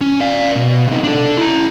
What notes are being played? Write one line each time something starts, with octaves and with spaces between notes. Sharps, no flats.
C#4
D5 F5
B2
C3 D#4
D4 A4
E4 A#5